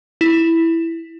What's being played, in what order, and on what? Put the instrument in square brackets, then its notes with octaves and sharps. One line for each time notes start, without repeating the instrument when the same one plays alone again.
[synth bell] E4